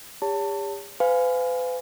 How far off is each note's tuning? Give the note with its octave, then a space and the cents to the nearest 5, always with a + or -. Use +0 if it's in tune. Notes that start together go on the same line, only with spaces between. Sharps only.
G4 +40 C#5 +35 A5 +25
B4 +40 F5 +0 G#5 +0